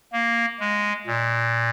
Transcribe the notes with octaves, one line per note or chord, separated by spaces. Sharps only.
A#3
G#3
A#2